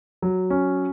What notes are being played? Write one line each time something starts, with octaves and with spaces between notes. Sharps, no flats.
F#3
C#4